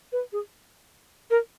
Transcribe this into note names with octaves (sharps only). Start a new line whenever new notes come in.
B4
G#4
A#4